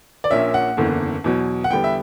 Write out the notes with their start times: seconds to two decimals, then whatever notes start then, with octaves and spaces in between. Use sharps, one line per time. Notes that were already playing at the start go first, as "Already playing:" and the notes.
0.24 D5
0.30 A#1 A#2 A#3 C#4 E5
0.54 F#5
0.77 F#1 E2 D3 A#3
1.24 E2 B2 F#3
1.64 F#5
1.70 E2 D3 G3 B3 G5
1.84 E5